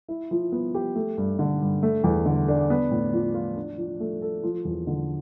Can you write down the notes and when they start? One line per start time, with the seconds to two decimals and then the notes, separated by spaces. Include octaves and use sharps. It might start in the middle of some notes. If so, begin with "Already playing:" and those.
0.08 E4
0.31 F3
0.52 B3
0.75 G4
0.95 A3
1.18 G2
1.39 D3
1.62 G2
1.83 A3
2.04 E2
2.26 D3
2.48 D4
2.70 B3
2.91 A2
3.13 F3
3.34 F4
3.56 D4
3.78 F3
4.00 A3
4.22 A4
4.43 F3
4.65 E2
4.87 D3